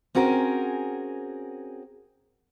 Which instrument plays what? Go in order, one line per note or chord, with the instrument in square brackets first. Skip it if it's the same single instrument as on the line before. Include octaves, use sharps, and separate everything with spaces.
[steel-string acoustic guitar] C4 C#4 F#4 G#4 A#4